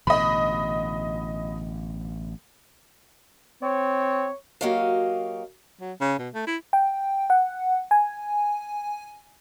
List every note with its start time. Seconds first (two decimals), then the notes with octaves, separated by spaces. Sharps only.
0.07 A1 B2 D3 D#5 B5
3.63 C4 C#5
4.61 F#3 A#3 F#4 G4 D#5 F5
5.81 F#3
6.01 C#3
6.19 B2
6.34 A3
6.47 E4
6.73 G5
7.30 F#5
7.91 G#5